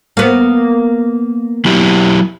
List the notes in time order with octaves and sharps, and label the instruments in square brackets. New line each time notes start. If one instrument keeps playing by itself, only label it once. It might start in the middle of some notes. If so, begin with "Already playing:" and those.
[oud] A#3 B3
[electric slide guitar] F#3 E4 G4